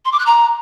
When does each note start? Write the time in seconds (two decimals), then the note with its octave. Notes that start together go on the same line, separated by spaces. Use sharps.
0.05 C6
0.12 D6
0.19 F#6
0.26 A#5